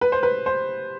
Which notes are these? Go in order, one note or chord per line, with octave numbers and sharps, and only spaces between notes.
B4
C5
B4
C5